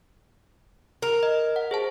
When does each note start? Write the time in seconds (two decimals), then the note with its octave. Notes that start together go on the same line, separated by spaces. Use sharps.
1.02 A#4
1.23 D#5
1.56 F#5
1.71 G#4 C5 A5